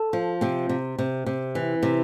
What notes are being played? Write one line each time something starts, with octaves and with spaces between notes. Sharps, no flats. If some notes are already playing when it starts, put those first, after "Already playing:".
Already playing: A4
F3
C3 C4
C3
C3
C3
E3
C3